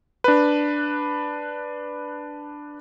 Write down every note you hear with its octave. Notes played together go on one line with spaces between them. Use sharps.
D4 B4